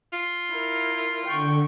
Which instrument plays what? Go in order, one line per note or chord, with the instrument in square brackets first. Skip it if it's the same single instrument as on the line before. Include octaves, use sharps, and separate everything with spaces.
[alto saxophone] F4
[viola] E4 A#4
[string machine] D3 [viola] G5 C#6